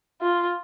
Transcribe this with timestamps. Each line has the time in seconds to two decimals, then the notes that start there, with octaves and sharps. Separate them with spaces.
0.22 F4